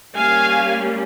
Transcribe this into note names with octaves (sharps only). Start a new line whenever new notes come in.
G3 A#3 C#4 F5 G#5